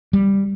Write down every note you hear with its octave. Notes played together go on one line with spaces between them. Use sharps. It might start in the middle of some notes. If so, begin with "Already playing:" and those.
G3